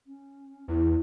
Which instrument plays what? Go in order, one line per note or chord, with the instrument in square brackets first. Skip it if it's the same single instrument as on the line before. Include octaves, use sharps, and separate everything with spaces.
[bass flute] C#4
[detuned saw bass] E2 [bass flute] E4